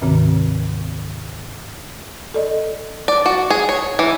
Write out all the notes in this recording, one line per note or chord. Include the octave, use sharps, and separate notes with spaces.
D2 G#2 C3 D#3 C4
A4 D5 D#5
D5
F#4
G#4
C#5
E3